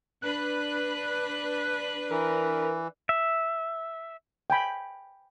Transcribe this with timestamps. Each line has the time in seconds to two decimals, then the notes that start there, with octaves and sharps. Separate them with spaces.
0.22 D4 B4 F#6
2.11 E3 A#4
3.09 E5
4.50 G5 G#5 B5